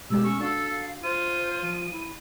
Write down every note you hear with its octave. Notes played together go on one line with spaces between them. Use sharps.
B2 G#3 A3 G4 E6
C#4 C#6
D4 F#4 A4 F5
F4 C5 D#7
F3
E4